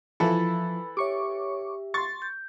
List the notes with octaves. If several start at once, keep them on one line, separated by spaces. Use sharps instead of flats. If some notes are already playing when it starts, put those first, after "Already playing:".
E3 F3 E4 A4 B4 B5
G4 C#5 E5 C#6 D6
C6 C#6 A6
G6